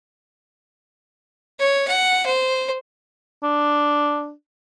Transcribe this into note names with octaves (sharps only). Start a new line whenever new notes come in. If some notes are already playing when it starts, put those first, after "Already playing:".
C#5
F#5
C5
D4